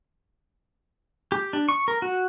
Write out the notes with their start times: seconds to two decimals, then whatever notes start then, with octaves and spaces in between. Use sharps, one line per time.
1.32 G4
1.53 D4
1.69 C#6
1.88 A#4
2.02 F#4